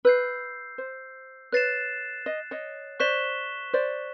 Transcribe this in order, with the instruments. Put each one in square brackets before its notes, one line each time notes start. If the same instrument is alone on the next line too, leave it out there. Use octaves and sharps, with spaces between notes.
[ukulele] B4 [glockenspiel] E6 G6 C7
[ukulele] C5
[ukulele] B4 C#5 [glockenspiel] F#6 A6 C7 E7
[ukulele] D#5
C#5 D#5
[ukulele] C5 D5 [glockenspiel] C#6 F#6 B6 E7 G7
[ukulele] C5 D5